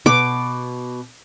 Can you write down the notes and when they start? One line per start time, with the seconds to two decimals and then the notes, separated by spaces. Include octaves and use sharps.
0.06 B2 D6